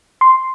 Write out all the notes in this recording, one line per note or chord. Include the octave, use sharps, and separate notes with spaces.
C6